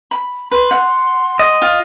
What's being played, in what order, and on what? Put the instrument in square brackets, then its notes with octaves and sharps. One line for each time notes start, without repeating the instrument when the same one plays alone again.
[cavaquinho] B5
[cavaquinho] B4 [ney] C6
[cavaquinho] F#5
[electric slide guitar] D#5
[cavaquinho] F4